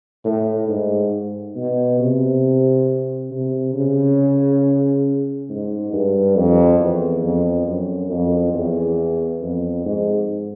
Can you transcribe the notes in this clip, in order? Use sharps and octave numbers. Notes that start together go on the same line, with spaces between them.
A2
G#2
B2
C3
C3
C#3
G#2
G2
F2
E2
F2
F#2
F2
E2
F2
G#2